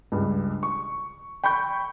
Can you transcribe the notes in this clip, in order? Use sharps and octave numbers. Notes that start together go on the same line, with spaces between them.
C#2 G2
C#6
G5 B5 C#6 G6